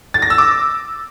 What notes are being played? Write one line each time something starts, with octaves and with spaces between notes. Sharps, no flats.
A6
A#6
E6
D6